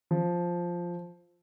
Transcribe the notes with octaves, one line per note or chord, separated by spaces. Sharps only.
F3